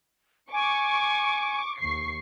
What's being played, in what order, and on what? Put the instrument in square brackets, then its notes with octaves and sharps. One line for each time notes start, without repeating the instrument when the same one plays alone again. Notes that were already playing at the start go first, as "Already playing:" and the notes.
[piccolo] G#5 [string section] C#6 D6
[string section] D#2 C#6 C7